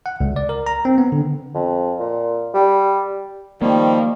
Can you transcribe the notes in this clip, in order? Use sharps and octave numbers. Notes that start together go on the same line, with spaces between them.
F#5
C#2
D5
A#4
A#5
C4
B3
D3
F2
A#2
G3
D#3 F3 G3 A#3